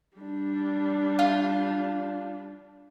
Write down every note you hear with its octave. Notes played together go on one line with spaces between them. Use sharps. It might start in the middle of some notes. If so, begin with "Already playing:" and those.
G3 D4
F4